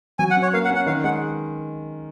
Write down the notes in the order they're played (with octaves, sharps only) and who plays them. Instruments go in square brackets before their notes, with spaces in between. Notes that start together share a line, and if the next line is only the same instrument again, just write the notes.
[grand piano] F#3 [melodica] G#5
[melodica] F#5
[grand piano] C#4
[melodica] C#5
[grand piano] A#3 [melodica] F5
[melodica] F#5
[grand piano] C#4
[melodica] F#5
[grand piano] D#3 [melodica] F5
[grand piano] G#3 [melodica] F#5